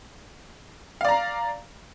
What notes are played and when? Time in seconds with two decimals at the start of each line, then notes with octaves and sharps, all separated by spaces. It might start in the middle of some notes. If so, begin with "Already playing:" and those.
1.01 F5
1.05 D5
1.09 A#5